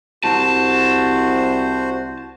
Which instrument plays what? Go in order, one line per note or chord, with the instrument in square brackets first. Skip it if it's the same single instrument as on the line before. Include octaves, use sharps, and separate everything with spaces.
[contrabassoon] C2 [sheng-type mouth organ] F#4 C5 [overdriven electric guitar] A5